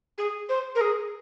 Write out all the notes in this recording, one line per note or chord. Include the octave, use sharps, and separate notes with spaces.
G#4
C5
A#4
G#4